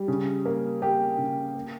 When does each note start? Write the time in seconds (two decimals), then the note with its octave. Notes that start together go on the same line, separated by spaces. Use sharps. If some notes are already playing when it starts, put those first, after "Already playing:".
Already playing: G3
0.08 C#3
0.46 A#3
0.82 A#3 G4
1.18 C#3
1.55 A#3